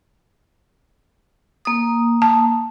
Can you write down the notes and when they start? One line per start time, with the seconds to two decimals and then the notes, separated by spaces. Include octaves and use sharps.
1.65 A#3 D#6
2.22 A5